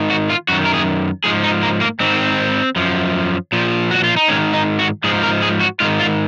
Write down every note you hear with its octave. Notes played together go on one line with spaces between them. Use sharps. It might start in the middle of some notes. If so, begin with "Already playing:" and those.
Already playing: G#2 D#3
F#4
F4
F#2 D#3 F#4
A#4
G#4
G#2 F3 G#4
D#4
A#3
A#3
G#2 D#3 C4
F#2 F3
A#2 F3
F#4
F4
D#4
G#2 D#3 C#4
D#4
F#4
G#2 F3 G#4
A#4
G#4
F#4
G#2 D#3 F4
F4